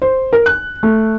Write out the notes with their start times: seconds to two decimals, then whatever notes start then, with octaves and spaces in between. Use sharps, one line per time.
0.02 C5
0.33 A#4
0.46 F#6
0.83 A3